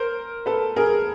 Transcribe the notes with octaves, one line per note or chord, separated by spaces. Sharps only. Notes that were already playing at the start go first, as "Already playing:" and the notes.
Already playing: A#4 C5
A4 B4
G#4 A#4